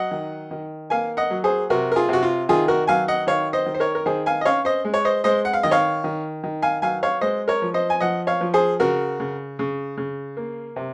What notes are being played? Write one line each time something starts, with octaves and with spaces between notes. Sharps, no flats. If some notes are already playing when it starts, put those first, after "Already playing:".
Already playing: F#3 D#5 F#5
D#3
D#3
A#3 F5 G#5
D#5 F#5
F#3
G#4 C5
C3 F#4 A#4
A#4
F4 G#4
C3 F#4
F4
D#3 F4 G#4
F#4 A#4
F#3 F5 G#5
D#5 F#5
D#3 C#5 F5
C5 D#5
D#3
C5
A#4 C#5
A#4
D#3 G#4 C5
F5 G#5
D#5
C#4 C#5 F5
C5 D#5
G#3
C#5
C5 D#5
G#3 C5 D#5
F#5
F5
D#3 D#5
C#5 F5
D#3
D#3
F5 G#5
F#3 F5 G#5
C#5 F5
G#3 C5 D#5
A#4 C#5
F3
C5 D#5
G#5
F3 D#5 F#5
C#5 F5
F3
G#4 C5
C#3 F#4 A#4
C#3
C#3
C#3
A#3
C3